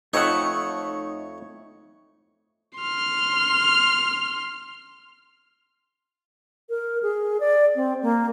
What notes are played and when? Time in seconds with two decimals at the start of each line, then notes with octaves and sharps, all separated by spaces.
0.13 F2 A3 D#4 C#5 F#5
2.78 C6 F6
6.69 A#4
7.03 G#4
7.40 D5
7.75 C4
8.02 A#3